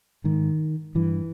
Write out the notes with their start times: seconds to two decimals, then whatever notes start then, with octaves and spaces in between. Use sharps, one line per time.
0.24 G#2 D#3
0.95 G2 E3